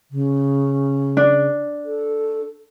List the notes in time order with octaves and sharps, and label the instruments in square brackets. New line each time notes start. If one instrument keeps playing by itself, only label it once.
[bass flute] C#3
[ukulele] D4
[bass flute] A4